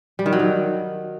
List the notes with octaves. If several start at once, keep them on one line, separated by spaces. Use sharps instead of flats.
G3
D#3
F#3
D#3